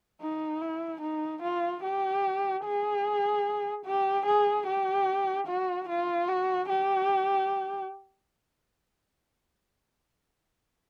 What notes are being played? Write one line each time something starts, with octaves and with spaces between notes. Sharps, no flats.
D#4
E4
D#4
F4
G4
G#4
G4
G#4
G4
F#4
F4
F#4
G4